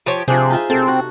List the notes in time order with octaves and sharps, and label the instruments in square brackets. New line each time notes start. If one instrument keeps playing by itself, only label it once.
[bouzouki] F3 G4 C#5
[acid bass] C3 [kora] F3 D4 C5 [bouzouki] G#4
[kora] D#4 F4 E5
[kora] C3 A4 [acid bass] C4
[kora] F#4